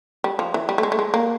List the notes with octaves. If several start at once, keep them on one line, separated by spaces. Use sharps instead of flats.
G3
F3
E3
G3
A3
G#3
A3
G#3
A#3